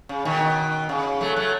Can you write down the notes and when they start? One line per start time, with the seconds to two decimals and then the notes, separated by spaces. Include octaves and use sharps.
0.09 C#3
0.25 B2 D#3
0.89 C#3
1.21 F#3 A3
1.36 F#3 A3